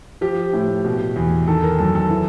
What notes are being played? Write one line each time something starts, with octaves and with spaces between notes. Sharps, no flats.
F3 G4
A2
B2
E2
D#3 A4
A#4
F#2 A4
A4
E3